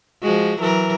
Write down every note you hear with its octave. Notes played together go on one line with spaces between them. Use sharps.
F3 G#3 F#4
E3 F#3 A#4